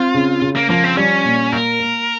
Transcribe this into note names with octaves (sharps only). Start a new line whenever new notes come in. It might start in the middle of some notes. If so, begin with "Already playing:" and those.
Already playing: C4 F4
C#3
C#3
A#3
F3 A#3
C4
G3 C#4
A#2
A#3 A#4
A#3